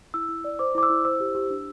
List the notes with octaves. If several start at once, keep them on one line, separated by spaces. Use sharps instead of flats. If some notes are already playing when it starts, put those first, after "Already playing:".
E4 E6
E4
D5
C5 D6
E4 D6
E6
E4
C5 E6
G4
G4
D4